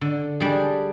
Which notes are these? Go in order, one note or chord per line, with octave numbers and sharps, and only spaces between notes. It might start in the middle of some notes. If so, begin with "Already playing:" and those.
D3
G3 D4 G#4